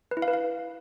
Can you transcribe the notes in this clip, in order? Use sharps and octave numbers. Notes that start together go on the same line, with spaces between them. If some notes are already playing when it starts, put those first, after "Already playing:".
B4
E4
F5
B4
F5